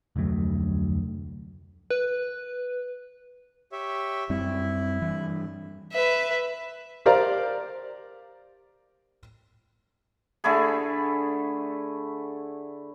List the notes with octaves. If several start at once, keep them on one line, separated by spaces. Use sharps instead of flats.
F1 D2 F#3 A3
B4
G4 C#5 E5
F#2 G3 C4 E4
G2 E3
B4 E5
G4 A#4 C5 D5 F5 A#5
D3 A3 E4 G#4